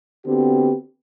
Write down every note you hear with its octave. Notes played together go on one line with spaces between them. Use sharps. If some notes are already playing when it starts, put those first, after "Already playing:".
D3 B3 C4 F#4 G4